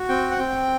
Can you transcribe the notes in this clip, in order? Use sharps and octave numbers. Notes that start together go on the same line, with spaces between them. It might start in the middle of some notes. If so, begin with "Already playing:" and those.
Already playing: F#4
C4 G5
F#5
C4 G5